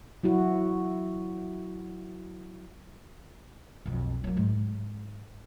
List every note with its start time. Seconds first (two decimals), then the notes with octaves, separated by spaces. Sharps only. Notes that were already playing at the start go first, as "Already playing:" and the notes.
0.23 F#3 E4 F#4
3.86 B1 F2
4.24 F#3 A#3
4.37 G#2